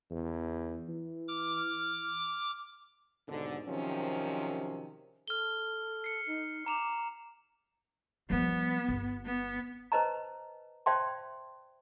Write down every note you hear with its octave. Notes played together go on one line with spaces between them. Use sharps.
E2
E3
D6 F6
D#2 G#2 B2 D3
C3 D#3 F3 F#3 C4 C#4
A4 F6 G7
C7 C#7
D#4
A#5 D6 E7 F7
F3 G3 B3
G1
B3
B4 C5 D#5 A5 A#5
C5 D5 E5 G5 A5 C6